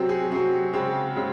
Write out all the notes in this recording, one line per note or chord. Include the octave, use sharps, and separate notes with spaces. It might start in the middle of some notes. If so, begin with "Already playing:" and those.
Already playing: C3 F#3 C4 F#4
G#4
C3 F#3 C4 F#4
C#3 G#3 C4
C#3 G#3 C4